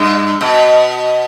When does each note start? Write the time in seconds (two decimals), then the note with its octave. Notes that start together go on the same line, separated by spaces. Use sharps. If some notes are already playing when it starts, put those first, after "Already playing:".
Already playing: G2
0.41 B2